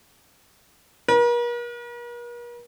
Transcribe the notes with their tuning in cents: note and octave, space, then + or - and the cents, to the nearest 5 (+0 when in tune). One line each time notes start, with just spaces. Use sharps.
A#4 +45